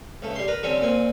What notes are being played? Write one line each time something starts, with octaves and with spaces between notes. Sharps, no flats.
C#2 A3
G3 C6
A#4 B4
D3 G3 C4 C#4
A#2 C4 G#5